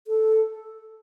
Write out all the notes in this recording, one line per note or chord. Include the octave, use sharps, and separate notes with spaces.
A4